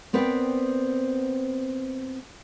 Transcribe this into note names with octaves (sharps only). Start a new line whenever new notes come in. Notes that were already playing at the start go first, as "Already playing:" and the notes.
B3 C4 A#4 B4 D5 G5